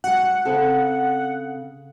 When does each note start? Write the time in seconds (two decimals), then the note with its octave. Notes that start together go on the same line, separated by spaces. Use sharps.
0.04 G3 F#4 F#5
0.45 C#3 C4 A4